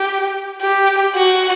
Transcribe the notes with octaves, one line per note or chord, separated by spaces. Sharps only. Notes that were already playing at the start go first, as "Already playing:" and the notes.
Already playing: G4
G4
F#4